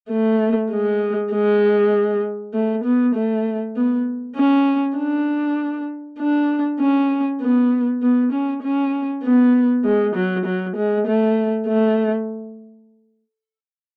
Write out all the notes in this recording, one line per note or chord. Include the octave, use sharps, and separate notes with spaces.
A3
G#3
G#3
A3
B3
A3
B3
C#4
D4
D4
C#4
B3
B3
C#4
C#4
B3
G#3
F#3
F#3
G#3
A3
A3